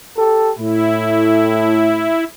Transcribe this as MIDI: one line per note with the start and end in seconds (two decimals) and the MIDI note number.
0.17 0.52 67
0.17 0.52 69
0.59 2.15 45
0.59 2.24 64